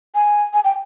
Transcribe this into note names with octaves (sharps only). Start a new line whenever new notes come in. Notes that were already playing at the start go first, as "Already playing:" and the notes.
G#5
G#5
G5